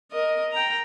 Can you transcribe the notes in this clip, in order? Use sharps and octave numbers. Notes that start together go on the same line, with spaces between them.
A#4 D#5
G5 A#5